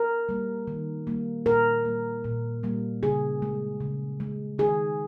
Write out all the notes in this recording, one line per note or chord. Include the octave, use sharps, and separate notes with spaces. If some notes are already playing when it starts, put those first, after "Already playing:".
Already playing: A#4
G3 A#3
D#3
G3 A#3
A#2 A#4
G3 A#3
A#2
G3 A#3
C#3 G#4
G#3
C#3
G#3
D#3 G#4